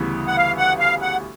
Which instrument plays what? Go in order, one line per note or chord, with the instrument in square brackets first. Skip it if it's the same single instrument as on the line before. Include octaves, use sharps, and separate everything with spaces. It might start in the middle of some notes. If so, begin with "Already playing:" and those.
Already playing: [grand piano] D2 C#3 E3 G3 B3
[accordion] F#5
F5
F#5
F5
F#5